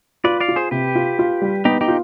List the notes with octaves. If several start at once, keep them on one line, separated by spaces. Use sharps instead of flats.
F4 B4 D5
D5 F5
F4
G#4 C5
C3 G4 B4
F4
F4
G3
B3 D#4 G4
D#4 G4
F4